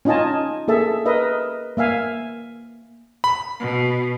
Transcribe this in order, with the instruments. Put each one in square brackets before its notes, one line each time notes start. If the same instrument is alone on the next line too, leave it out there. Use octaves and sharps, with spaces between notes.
[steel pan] C#4 D#4 F4 D#5 G#5 A5
A#3 G#4 A4 E5 A5
A#4 B4 D#5 E5
A#3 E5 F5 G#5
[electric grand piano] B5
[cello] B2